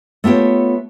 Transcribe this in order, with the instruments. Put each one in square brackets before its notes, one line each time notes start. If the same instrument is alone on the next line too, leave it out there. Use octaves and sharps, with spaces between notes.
[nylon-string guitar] A3 B3 F4 G4 C#5